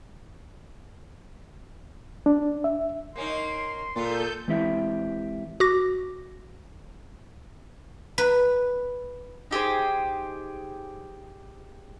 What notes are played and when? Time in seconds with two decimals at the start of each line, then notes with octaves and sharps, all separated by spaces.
2.26 D4
2.64 E5
3.16 A#3 C#4 D#4 C6
3.96 A#2 B3 F4 A4 G6
4.48 E3 G#3 C4 E4 G4 E5
5.60 F#4 D6 A#6
8.18 B4
9.51 D#4 G4 G#4 C5